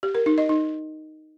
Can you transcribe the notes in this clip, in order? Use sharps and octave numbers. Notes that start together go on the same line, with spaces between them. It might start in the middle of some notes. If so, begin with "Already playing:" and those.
G4
A#4
D#4
D#5
D#4